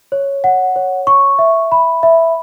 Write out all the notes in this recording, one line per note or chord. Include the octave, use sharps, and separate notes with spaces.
C#5
F#5
C#5
C#6
E5
B5
E5